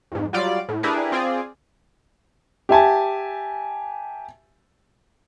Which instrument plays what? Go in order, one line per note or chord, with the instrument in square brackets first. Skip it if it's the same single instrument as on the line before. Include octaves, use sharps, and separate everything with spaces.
[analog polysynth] F2 G#2
F#3 G3 F4 D5
A2
D4 E4 G4 G#4 A#4 B4
C4 F4 G#4 D5
[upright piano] G4 E5 G#5 A5